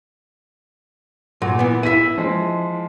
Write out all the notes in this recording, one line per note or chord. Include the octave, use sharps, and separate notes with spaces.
A#2 F#3
E3 B3
E4 E5 B6 D#7
F3 G#3